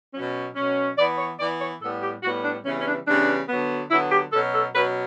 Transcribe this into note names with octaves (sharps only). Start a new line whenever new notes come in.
B2 F#3 C#4
B2 F#3 C#4
E3 B3 D5
C#5
E3 B3 D5
C#5
A2 G3 B3 A4
G4
A2 G3 B3 F#4
D4
C#3 E3 G3 B3 C#4
C#4
D4
C#3 E3 G3 B3 D4
D3 F#3 B3
D3 F#3 B3 E4
G4
B2 F#3 C#4 A4
A4
B2 F#3 C#4 B4